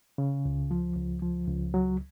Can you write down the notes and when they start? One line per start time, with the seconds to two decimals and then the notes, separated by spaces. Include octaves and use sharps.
0.18 C#3
0.45 C#2
0.71 F3
0.96 C#2
1.22 F3
1.48 C#2
1.74 F#3